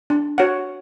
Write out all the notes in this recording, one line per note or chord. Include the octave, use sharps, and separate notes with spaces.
D4
F#4 C#5 F#5